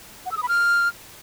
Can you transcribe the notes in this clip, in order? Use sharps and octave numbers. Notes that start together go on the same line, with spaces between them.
F#5
E6
D#6
B5
F6